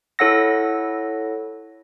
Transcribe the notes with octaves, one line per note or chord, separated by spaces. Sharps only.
E4 A4 C#5 F#5 E6 A#6